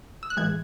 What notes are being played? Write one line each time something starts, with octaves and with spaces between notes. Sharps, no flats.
E6
F#6
A2 E3 G#3 G#6